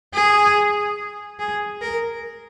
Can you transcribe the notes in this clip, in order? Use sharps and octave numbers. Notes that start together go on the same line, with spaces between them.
G#4
G#4
A#4